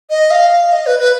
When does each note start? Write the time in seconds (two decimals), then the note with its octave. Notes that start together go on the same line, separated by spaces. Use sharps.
0.10 D#5
0.31 F5
0.73 D#5
0.86 B4
0.99 B4